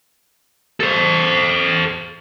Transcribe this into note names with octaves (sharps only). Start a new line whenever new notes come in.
A4 C5